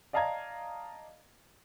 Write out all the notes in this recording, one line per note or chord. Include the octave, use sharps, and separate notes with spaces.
D5 D#5 F5 A5 A#5 G#6